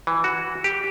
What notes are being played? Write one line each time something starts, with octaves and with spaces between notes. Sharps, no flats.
E3
F#4
G4